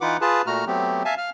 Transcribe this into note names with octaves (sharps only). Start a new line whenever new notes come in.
E3 D#4 F4 B4 F#5 D6
F4 G#4 B4 A5
A#2 A3 F#4 A#5 F6
F#3 A3 B3 C4 G4
E5 F5 G#5 A5
F5 F6